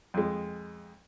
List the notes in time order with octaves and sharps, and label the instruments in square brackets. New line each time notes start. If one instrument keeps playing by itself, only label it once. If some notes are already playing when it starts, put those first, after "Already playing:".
[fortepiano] F2 G#3